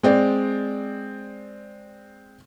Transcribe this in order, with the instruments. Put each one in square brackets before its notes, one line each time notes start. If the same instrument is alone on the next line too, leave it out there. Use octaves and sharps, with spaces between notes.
[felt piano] G#3 C4 D5